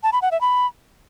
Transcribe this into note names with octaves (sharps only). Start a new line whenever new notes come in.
A5
B5
F#5
E5
B5